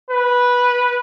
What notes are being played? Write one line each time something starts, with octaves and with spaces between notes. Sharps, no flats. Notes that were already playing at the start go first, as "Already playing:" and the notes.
B4